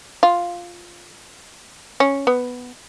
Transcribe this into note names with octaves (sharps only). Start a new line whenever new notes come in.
F4
C#4
B3